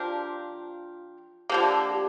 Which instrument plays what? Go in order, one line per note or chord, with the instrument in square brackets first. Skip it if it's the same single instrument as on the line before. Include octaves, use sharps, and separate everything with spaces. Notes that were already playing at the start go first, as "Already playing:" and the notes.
Already playing: [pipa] F3 D4 G4 A#4 [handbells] F4
[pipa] D3 F3 A#3 [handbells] G4
[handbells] G4